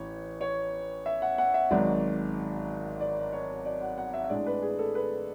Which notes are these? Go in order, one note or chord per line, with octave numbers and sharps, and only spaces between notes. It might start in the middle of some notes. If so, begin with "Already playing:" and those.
Already playing: A1 E3 C#5
C#5
E5
F#5
F#5
E5
G#1 G#2 F#3 D5
D5
C#5
D5
F#5
F#5
E5
E5
A2 G#3 D4 D5
B4
G#4
A4
B4